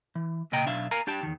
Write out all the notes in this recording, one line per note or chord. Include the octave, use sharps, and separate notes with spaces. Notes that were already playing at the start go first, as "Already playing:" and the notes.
E3
C2 A#2 C#3 D#5 G5 A#5
B1 D4 E5 F5
A#4 F5 G#5 A#5
D4 G4 G5 A5
E2 D#3